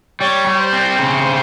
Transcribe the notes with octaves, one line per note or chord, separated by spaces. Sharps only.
G3 C#5
G3
C5
C4
C#3
C4